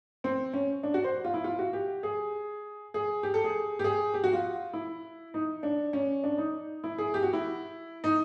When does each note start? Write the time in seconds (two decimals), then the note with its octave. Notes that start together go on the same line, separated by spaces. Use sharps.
0.24 C4
0.53 C#4
0.83 D4
0.94 F#4
1.04 C5
1.25 F4
1.34 E4
1.44 F4
1.59 F#4
1.73 G4
2.03 G#4
2.94 G#4
3.23 G4
3.34 A4
3.44 G#4
3.79 G4
3.84 G#4
4.14 G4
4.24 F#4
4.33 F4
4.73 E4
5.34 D#4
5.63 D4
5.93 C#4
6.24 D4
6.38 D#4
6.84 E4
6.98 G#4
7.14 G4
7.23 F#4
7.33 E4
8.04 D#4